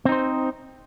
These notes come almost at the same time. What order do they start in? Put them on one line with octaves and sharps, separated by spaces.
C4 D#4 C5